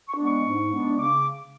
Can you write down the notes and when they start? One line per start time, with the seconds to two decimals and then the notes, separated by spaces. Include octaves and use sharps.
0.09 C#6
0.17 G#3 B3 D4
0.26 C#6
0.44 G#2
0.71 G#3 B3 D4
0.97 C#3 D6